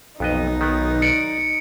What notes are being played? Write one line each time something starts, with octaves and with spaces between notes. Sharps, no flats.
B1 F2 B3 D#4 D#5
D#3 B3
D5 C#7 D7